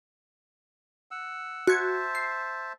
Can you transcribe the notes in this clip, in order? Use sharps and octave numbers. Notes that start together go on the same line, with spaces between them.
F#5 E6
F#4 C5 E5 A5 G#6
C7